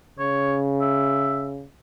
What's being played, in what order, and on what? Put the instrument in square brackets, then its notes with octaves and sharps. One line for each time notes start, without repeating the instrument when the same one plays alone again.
[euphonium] C#3 [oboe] C#5
[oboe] E5